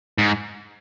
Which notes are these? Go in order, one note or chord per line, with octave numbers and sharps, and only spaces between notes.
G#2